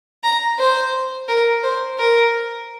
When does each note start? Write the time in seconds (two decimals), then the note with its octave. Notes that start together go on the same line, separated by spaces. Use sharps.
0.23 A#5
0.59 C5
1.28 A#4
1.63 C5
1.98 A#4